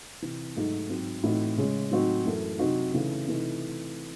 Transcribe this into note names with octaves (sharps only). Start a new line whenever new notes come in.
C3 E3 C4
G#2 F#3 A3 D#4 F#4
G#2 F#3 C4
A2 E3 C4 D#4 F#4
C#3 G#3 C#4
A2 F#3 C4 D#4 F#4
F#2 E3 A3
C3 F#3 C4 D#4 F#4
C#3 E3 A3 D#4
C3 E3 A3 D#4